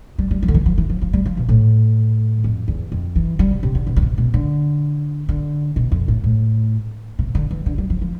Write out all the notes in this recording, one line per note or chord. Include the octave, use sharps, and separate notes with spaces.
G3
G3
F3
D3
E3
F3
E3
F3
F3
G3
F3
B2
A2
F2
E2
F2
E3
G3
C3
C3
D3
B2
D3
C3
B2
D3
D3
B2
F2
A2
A2
C3
D3
E3
D3
G3
F3
F3